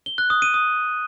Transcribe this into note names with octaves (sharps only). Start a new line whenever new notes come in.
G7
F#6
D#6
D#7
D#6